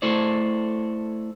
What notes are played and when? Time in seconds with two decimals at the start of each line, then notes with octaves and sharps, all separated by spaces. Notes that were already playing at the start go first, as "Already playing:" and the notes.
0.02 A3 E4 A4 C5 D5